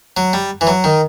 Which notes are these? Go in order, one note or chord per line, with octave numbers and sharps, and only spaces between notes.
F#3
G3
E3
F#3
D#3